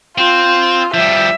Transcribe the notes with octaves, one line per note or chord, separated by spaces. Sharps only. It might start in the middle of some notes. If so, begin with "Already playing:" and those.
C4 F4
F3 G3 E5